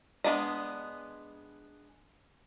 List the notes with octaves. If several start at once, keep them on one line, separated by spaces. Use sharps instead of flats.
G#3 B3 D4 D#5